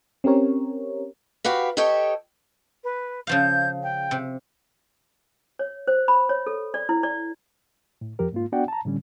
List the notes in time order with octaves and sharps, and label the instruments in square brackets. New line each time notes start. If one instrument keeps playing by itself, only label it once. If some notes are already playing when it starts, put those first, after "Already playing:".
[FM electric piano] C4 C#4 G4 A#4 C#5
[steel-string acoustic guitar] F#4 G4 B4 F5
G4 A4 C#5 D#5 G5
[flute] B4
[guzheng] C#3 F3 F5 [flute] G6
[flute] G5
[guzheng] C3
[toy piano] C#5
C5
B5
C#5
A4
D5
E4
D5
[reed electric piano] A2
F2 F3 G4 A#4
G#2 A#3 F4
B3 D4 F#4 D5 F#5 G5
A5 A#5
A2 D3 G3 C#4